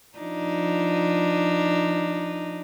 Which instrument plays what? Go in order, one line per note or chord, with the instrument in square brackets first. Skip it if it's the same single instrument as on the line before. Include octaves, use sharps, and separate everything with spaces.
[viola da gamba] F3 D4 D#4